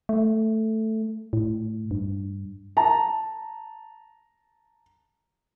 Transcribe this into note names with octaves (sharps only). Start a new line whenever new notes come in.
A3
A2
G2
A5 A#5